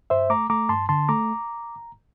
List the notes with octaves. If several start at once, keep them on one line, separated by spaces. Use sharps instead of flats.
G2 C5 E5
A3 A#5 D6
A3 A#5 D6
G2 A5 C6
D3 A5 C6
A3 A#5 D6